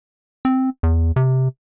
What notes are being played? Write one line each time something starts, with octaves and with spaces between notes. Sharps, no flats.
C4
E2
C3